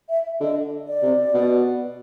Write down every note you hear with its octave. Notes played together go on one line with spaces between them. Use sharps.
E5
D3 D#5
D5
C3
B2